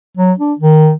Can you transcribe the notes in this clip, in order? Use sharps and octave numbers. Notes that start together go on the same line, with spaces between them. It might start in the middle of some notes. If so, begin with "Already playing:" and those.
F#3
D4
D#3